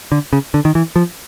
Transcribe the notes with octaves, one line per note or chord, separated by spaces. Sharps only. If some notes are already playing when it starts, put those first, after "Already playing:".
D3
C#3
D3
D#3
E3
F3